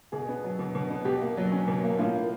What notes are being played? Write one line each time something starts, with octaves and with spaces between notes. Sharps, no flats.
B2 G#4
B3
F#3
B2
B2
B3
B2 G4
A#3
F#3
C#4
B2
A#3
A2 F4
A#3